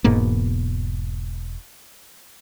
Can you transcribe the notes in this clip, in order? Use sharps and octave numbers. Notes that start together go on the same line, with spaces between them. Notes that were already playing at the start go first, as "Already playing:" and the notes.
E1 G#2 B2 A#3